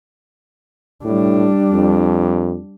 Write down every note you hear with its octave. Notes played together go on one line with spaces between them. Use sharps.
A2 G3 D4
F2